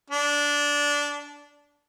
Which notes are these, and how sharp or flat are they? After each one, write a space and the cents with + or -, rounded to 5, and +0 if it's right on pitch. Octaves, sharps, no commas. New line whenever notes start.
D4 -15